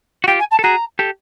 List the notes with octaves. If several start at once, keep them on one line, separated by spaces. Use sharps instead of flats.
F#4
F4 G4 G5
G#5
A5
A4
F#4 G#4 A#5
G4 A4